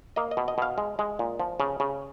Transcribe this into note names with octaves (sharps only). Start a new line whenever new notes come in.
A#3 D#5
D#5
B2
D#5
B2 F5
G#3
G#3
A#2
F3
C#3
C#3